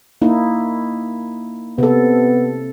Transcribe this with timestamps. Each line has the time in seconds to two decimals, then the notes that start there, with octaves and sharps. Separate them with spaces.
0.22 A#3 D#4 E4
1.78 C3 B3 A4